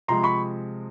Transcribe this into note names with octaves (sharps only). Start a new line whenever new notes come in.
C3 F3 G#3 A#5 C6
B5 C#6